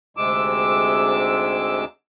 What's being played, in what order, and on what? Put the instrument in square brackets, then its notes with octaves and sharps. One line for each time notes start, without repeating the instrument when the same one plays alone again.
[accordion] D2 G#2 C3 G#3 D6 E6